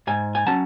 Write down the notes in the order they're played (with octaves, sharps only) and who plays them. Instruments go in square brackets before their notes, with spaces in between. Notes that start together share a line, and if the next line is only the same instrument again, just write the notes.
[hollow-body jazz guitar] G#2 G#5
G#5
F#3 C#4 A5